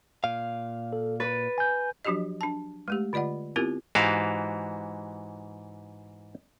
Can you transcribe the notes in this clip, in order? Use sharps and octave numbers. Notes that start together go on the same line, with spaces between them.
A#2 F5
A4
B4 A6
G#5 G6
F3 F#3 D4 F#4 G4 D#5
D4 A5
G#3 A3 G4
D3 F4 D5 D#5 F#5
B3 C4 E4 F4 G4 A#4
G#2 E3 F#4 G4 F5